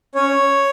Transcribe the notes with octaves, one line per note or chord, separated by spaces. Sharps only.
C#4 C#5